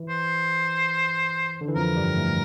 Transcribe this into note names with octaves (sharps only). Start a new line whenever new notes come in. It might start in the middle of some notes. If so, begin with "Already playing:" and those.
Already playing: E3
C5
D3
E3
F2 F3 A#4
G2 G3
A2 A3